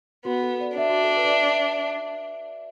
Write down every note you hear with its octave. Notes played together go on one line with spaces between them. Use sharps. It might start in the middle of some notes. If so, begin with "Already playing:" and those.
B3 F#4
A4
D5
D4 E5
F#4
A4
B4
D5
E5
E5